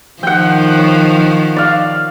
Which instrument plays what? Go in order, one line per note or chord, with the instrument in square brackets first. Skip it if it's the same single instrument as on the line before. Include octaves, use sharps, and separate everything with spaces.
[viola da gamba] D#3 F3 [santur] F#5 G5
[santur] C#5
D5 F5